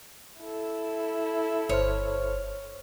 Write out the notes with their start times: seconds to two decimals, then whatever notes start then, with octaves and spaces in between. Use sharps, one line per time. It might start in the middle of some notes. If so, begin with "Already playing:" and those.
0.40 E4 A4
1.69 G1 C5 C#5 F6